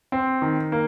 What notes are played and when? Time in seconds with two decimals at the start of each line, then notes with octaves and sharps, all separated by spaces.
0.12 C4
0.42 D#3
0.72 A#3